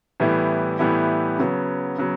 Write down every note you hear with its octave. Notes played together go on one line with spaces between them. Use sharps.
A2 E3 G3 B3 E4
A2 E3 G3 B3 E4
C#3 F#3 B3
C#3 F#3 B3